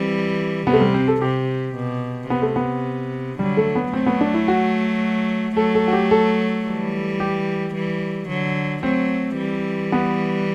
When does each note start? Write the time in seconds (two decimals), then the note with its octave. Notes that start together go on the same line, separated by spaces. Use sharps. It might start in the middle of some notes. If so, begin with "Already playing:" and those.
Already playing: E3 G3 C4
0.67 C3 B3
0.73 A3
0.81 G3
0.94 C4
1.08 A4
1.21 C3 G4
1.76 B2
2.30 C3 B3
2.42 A3
2.56 B3
3.39 D3 F#3 G3
3.57 A3
3.75 B3
3.93 F#3 A3 C4
4.06 B3
4.21 D4
4.34 E4
4.48 F#4
5.57 F#3 A3 A4
5.75 A4
5.88 F#4
5.93 G4
6.11 A4
6.65 E3 G3
7.20 G4
7.74 E3 G3
8.29 D3 F#3
8.83 F#3 A3 C4
9.38 E3 G3
9.92 B3